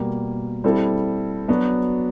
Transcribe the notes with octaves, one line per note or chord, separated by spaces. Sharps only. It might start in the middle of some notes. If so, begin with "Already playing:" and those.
Already playing: B2 G3 A#3
G3 C4 E4 A4
F#3 B3 D4 F#4